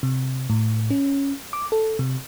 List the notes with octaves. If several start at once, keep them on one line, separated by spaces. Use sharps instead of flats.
C3
A2
C#4
D6
A4
C3